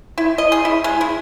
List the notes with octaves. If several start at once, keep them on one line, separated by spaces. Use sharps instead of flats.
E4
D#5
G#4
E4
G#3
E4